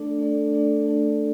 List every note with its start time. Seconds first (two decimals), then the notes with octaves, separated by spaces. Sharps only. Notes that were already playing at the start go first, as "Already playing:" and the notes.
Already playing: A3 D4 A4 D5
0.19 A3 D4 A4 D5
0.52 A3 D4 A4 D5
0.85 A3 D4 A4 D5